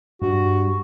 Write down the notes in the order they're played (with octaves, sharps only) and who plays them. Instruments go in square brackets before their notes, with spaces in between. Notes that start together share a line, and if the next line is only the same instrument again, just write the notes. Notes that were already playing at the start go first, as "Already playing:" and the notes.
[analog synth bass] G2 [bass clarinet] F#4